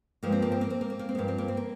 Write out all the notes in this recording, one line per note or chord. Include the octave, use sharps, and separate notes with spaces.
G2 F3 G#3 A#3
C4
A#3
C4
A#3
C4
A#3
C4
A#3
C4
G2 F3 G#3 A#3
C4
A#3
C4
A#3